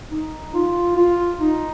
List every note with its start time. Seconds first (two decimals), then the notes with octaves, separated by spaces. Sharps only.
0.12 D#4
0.54 F4
0.97 F4
1.40 D#4